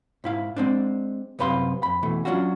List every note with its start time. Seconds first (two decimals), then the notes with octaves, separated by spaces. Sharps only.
0.24 G#2 E4 F5
0.57 G#3 C4 D4
1.39 C2 F#2 C3 B4 F5 C6
1.83 F2 B5
2.03 B2 E3 A3
2.25 F#3 G3 C#4 D4 F4 F#4